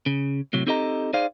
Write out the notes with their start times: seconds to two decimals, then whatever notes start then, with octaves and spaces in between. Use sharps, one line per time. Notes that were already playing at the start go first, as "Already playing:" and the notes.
0.06 C#3
0.53 A2 C3 F#3
0.67 C4 D#4 G4 A4 D#5 A#5
1.13 D#4 G#4 C5 D5 F5